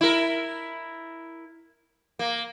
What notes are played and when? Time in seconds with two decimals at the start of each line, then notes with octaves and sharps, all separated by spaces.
0.01 E4 A#4
2.19 A#3